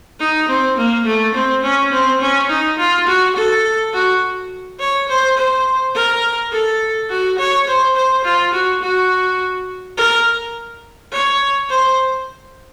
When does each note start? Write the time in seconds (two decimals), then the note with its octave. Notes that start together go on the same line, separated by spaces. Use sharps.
0.20 D#4
0.48 C4
0.77 A#3
1.06 A3
1.34 C4
1.63 C#4
1.92 C4
2.21 C#4
2.49 D#4
2.78 F4
3.07 F#4
3.36 A4
3.94 F#4
4.80 C#5
5.08 C5
5.37 C5
5.95 A#4
6.52 A4
7.09 F#4
7.38 C#5
7.67 C5
7.96 C5
8.24 F4
8.53 F#4
8.82 F#4
9.97 A#4
11.12 C#5
11.70 C5